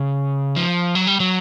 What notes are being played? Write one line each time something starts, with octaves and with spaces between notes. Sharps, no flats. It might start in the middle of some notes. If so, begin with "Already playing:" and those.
Already playing: C#3
F3
F#3
G3
F#3